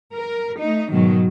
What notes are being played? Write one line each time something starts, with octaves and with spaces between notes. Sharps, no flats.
A#4
A3 D#4
G#2 B2 D#3 F#3